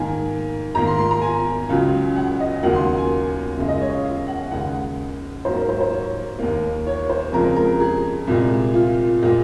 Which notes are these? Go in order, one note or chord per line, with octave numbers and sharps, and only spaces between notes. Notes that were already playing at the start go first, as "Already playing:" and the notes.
Already playing: G#2 D#3 A#3 G#5
G#2 D#3 A#3 A#5
C6
C6
A#5
G#5
C#2 C#3 F#3
F#5
D#5
D#2 C#3 F#3 A#3 F#5
C6
G#5
F#2 C#3 G#3
D#5
C#5
F5
F5
F#5
D#2 C#3 G#3 F#5
G#2 F#3 A#3 C5
A#4
C5
C5
C#5
D#2 D#3 A#3
C#5
C5
F2 C#3 G#3 A#4
A#4
G#4
C2 A#2 G#3
F4
A#2 G#3